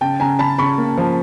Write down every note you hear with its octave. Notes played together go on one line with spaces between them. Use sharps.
C#3 G5 A5
C#3 G#5 A#5
C#3 A5 B5
C#3 B5 C#6
A#3
F3